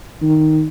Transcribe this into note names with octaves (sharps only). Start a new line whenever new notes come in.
D#3